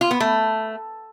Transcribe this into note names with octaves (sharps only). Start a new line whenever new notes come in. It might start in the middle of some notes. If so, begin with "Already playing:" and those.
F4
B3
A3